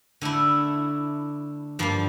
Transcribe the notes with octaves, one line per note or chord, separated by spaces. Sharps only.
D3 A3 E4
G2 F3 A#3